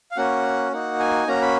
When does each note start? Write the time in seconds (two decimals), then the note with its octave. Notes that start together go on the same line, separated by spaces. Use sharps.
0.11 F5
0.17 A#3 C#4 F#4 F#5
0.72 A#3 D#4 F#4 F#5
1.00 G#5
1.27 A#3 C#4 F#4 A#5
1.42 B5